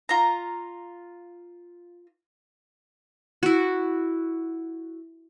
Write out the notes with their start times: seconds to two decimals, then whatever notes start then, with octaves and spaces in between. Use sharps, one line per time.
0.09 F4 A#5
3.43 E4 F#4